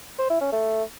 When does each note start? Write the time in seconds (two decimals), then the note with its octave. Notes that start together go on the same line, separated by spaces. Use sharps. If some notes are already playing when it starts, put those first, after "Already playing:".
0.19 C5
0.30 E4
0.41 C#4
0.52 A3